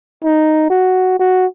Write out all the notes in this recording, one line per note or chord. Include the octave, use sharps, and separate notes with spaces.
D#4
F#4
F#4